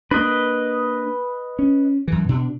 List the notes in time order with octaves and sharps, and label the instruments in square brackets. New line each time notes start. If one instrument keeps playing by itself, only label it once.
[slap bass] A#3 D4 [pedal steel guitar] B4 D#5
[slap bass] C#4
F#2 E3
B2 D4